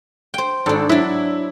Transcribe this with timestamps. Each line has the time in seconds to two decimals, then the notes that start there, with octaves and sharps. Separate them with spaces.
0.34 C5 G5
0.66 G#1 G#2 D4 A4
0.89 F#3 D4 E4